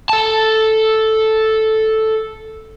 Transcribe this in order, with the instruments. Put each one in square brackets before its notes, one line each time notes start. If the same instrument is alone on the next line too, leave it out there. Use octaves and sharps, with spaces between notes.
[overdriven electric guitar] A4 A5